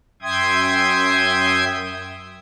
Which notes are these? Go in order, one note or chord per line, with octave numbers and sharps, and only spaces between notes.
F#2 E5 G5 C6 D#6 G#6